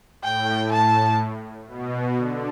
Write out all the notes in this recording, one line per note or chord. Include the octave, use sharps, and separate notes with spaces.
A2 G5
A5
B2
D3